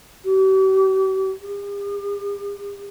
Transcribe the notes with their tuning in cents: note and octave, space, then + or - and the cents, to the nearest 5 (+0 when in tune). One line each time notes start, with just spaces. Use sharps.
G4 -45
G4 +45